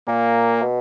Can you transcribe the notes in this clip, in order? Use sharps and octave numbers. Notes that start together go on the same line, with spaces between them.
A#2 A#3
B2